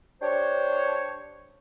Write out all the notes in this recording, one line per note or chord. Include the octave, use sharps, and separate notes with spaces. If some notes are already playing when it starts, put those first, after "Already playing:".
D4 G4 C5 C#5